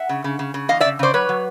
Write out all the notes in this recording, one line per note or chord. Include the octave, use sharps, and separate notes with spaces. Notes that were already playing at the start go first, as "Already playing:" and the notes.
Already playing: E5 F#5
C#3
C#3
C#3
C#3
E2 D#5 F5
D5 E5
C#3
C#3 C5 D5
F#3 B4 C#5
F#3